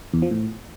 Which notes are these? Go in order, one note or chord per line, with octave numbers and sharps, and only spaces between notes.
E2
F3
A2